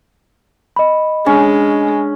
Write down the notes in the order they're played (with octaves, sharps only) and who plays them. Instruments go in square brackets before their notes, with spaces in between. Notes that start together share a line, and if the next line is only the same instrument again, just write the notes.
[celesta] D#5 B5
[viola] G#3 [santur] C#4 [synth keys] D4